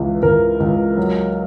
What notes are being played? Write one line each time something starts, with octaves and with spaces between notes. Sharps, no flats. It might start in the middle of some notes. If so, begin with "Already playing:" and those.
Already playing: C#2 E3
C#2 A#4
C#2
F#3